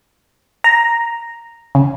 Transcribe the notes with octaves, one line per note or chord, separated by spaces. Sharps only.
A#5
C#3